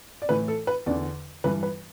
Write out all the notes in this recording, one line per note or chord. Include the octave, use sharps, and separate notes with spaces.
D5
A2 E3 B4
A4
B4
E2 D3 D5
G2 E3 B4
B4